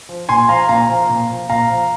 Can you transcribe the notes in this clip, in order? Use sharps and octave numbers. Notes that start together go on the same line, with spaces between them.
F3
A#2 G#5 C6
F3 F5 A#5
A#2 F5 A#5
F3
A#2
F3
A#2 F5 A#5
F3